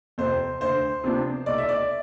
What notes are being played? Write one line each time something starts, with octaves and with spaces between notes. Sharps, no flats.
F2 C3 C5
D2 C5
C3 F3 B3 D4
B1 D5
E5
D5